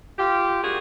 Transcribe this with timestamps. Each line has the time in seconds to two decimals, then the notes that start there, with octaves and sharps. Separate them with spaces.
0.17 D3 F4 G4
0.63 G3 A#3 D4 F#4 G#4